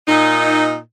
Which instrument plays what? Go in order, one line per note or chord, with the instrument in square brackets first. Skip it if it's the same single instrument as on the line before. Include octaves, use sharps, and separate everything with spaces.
[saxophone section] A#2 D#4